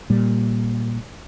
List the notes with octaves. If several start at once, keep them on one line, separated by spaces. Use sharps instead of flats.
A#2 G3